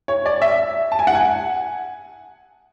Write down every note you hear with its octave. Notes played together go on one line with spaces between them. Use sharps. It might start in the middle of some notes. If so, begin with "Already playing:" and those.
C#5
D5
E5
A5
G#5
F#5
G#5